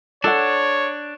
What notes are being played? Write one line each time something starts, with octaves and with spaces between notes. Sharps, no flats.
D4 A4 C#5 F#5